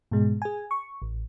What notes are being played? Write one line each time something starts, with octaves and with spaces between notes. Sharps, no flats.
G#2 B2 G#3
G#4 G#5
C#6
A1